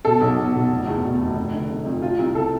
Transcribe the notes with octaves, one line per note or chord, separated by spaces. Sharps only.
B2 A4
B1
B2
B2
F1
E2
B2
F1
F1
D3
F1
F2
C3 F4
C2
C3 A4